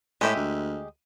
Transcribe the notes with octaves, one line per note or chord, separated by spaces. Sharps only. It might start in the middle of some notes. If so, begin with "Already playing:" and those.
A2 G#3 G4 E5
D2